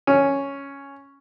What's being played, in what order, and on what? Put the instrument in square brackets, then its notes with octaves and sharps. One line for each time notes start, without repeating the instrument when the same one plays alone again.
[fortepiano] C#4